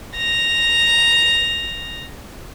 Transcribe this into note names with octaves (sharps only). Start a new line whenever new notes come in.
A#6 F7